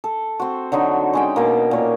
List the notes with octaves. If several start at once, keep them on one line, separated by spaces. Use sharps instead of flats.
A4
C4 F#4
D3 F#3 D#4
G#3 C#4 G5
B2 A#3
A#2 C#5